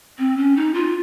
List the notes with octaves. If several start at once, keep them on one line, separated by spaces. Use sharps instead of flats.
C4
C#4
D#4
F4